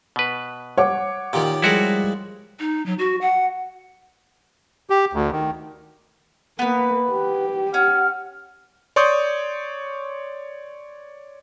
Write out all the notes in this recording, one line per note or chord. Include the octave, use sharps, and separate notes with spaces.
B2 B4
C#5 F#5 D6
A#2 D#3 F4 G4
F3 G3 G#3 E4 F#4 A#4
D#4
F#3
F#4
F#5
G4
D2
D#3
A#3 B3 B4
G4
C#4 F#5 F6
C#5 D5 C6 C#6 D#6 G6